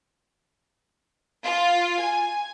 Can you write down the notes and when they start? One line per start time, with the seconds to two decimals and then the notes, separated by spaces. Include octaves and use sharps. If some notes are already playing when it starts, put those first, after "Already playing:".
1.44 F4
1.99 G#5